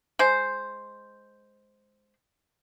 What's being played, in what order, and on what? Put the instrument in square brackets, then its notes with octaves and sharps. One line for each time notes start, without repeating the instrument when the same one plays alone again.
[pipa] G#3 C5